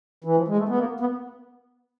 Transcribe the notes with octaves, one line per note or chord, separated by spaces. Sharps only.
E3
F3
G#3
A3
B3
A#3
B3